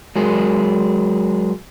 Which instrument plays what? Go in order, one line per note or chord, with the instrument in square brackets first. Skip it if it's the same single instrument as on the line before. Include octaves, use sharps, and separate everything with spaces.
[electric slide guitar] F#3 G#3 G#4 A#4